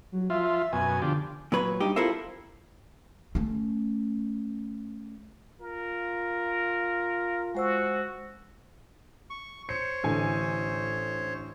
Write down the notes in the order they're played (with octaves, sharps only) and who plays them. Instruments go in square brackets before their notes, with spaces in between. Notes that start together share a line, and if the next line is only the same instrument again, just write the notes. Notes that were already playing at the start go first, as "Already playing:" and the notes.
[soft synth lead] F#3
[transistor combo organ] F3 F4 [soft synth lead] E5
[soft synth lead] E5
[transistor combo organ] F#2 B2 [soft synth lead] G#5
[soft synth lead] D3 [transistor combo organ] F3 D4 G4
[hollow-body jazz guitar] A#2 F#3 B4 C#5
G2 D#4 G4
E4 F4 A4 A#4 C5 E5
[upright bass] A3 C#4
[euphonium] F4 [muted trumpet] A#4
[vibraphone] G#3 C5 E6 [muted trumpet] F#4
[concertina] C#6
[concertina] C5 C#5 [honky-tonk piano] C#7
[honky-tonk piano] A1 D3 G#5